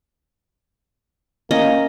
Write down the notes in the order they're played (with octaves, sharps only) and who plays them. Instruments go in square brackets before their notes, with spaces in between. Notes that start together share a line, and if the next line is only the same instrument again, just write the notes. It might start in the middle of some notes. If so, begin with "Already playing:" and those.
[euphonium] A#3 [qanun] C#4 D#5